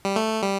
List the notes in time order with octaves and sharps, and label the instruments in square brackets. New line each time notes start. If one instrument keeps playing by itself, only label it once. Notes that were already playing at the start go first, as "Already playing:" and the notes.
[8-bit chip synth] G3
A3
G3